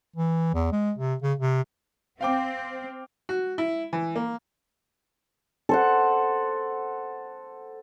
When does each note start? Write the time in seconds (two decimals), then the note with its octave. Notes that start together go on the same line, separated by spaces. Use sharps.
0.16 E3
0.54 E2
0.72 G#3
0.98 C3
1.23 C#3
1.39 C3
2.21 C4 F5 G5 D6
3.29 F#4
3.58 E4
3.93 E3
4.16 A#3
5.69 A4 C5 F#5